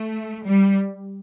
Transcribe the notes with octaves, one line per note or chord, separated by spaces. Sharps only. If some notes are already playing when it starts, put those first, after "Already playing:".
Already playing: A3
G3